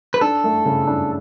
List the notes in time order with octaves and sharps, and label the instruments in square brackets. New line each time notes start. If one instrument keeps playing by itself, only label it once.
[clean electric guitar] B4
[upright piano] D4 [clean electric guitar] A4
[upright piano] A3
C#3
D4